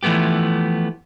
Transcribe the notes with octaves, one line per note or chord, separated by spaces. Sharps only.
E3 F3 A3 B3 G4